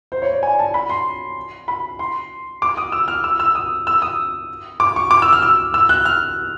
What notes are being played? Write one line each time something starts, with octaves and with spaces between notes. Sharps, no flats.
C5
C#5
D5
G#5
A5
B5
C6
B5
C6
D6
D#6
E6
F6
E6
E6
D#6
E6
D#6
D6
C#6
D6
E6
F6
E6
E6
F#6
F6